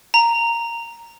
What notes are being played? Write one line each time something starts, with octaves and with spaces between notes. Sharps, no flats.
A#5